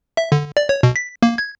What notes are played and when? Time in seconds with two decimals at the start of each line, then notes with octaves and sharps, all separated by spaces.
0.17 E5
0.32 D3
0.57 D5
0.69 C#5
0.83 B2
0.96 B6
1.23 A#3
1.38 G#6